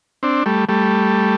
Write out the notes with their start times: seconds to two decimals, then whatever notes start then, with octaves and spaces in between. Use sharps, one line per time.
0.23 C4 D4
0.46 G3 A3
0.69 G3 A3